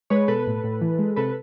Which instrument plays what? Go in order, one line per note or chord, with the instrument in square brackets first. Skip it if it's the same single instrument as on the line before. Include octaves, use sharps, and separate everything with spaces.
[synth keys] G#3 B4 C#5
B2 A4 B4
A2
A2
E3
G#3
C3 A4 B4